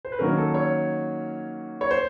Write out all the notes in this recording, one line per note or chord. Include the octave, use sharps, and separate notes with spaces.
C5
B4
D#3 F#3 A#3 C#4 A#4
A4
C#5
C#5
C5